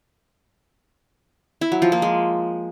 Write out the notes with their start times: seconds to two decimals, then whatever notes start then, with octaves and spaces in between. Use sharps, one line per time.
1.61 E4
1.72 F#3
1.82 F3
1.92 A#3
2.02 G#3